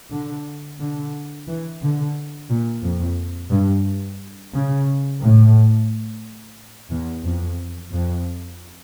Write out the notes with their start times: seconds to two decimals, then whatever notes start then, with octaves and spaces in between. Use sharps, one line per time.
0.11 D3
0.79 D3
1.47 E3
1.81 D3
2.49 A#2
2.82 F2
3.50 G2
4.53 C#3
5.20 A2
6.90 E2
7.24 F2
7.91 F2